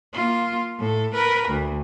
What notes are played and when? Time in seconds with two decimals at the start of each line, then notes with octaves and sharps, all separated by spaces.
0.14 A#3 F4
0.79 A2 A4
1.14 A#4 B4
1.48 D2